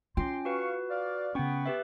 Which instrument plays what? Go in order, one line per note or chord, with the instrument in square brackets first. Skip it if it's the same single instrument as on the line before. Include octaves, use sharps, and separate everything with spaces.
[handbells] C#4 G5 [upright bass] F4 [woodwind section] C6
[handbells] F#4 B4 [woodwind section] F5 C#6
[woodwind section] D5 F5
[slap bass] C#3 C#4 [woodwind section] B3 [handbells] G5 C#6
[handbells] G4 B4 E5